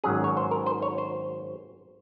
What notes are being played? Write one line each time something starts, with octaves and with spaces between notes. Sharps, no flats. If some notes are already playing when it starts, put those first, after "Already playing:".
G#1 G#2 F#3 C#4 G#4
C#5
C5
A#4
C5
C#5
C5